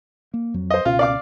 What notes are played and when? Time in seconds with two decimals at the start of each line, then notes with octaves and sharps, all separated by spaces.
0.34 A#3
0.54 F2 F#3
0.70 C5 D#5
0.85 C#2 B2 C#4 F4
0.99 D5 F5 D6